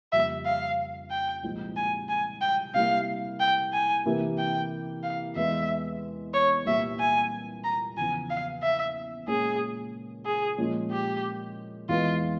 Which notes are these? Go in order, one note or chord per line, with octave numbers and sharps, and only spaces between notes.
F2 C#3 G3 A#3 E5
F5
G5
C2 A#2 F3 G#3 C4
G#5
G#5
G5
C3 G3 A#3 E4 F5
G5
G#5
C3 E3 A#3 E4 G4
G5
F5
E2 E3 G#3 E5
C#5
C2 A#2 G3 E5
G#5
A#5
E2 C#3 F3 G#5
F5
E5
A#2 G#3 C#4 F4 G#4
G#4
A#2 F3 G#3 C#4
G4
E2 E3 G#3 F4